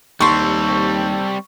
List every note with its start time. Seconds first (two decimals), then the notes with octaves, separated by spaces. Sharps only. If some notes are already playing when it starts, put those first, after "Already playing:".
0.20 D#2 G3 C4 A4 C6 C#6